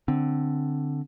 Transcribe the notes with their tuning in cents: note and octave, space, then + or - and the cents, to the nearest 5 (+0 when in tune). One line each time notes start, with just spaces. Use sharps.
D3 +0 C4 -5